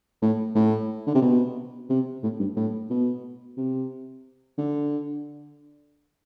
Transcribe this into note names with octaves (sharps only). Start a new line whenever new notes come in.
A2
A2
D3
C3
B2
C3
A2
G2
A2
B2
C3
D3